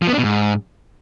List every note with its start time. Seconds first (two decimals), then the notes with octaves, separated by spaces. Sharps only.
0.02 F3
0.07 B3
0.13 D4
0.18 B2
0.24 G#2